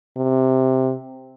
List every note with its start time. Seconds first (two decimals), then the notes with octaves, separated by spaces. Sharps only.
0.17 C3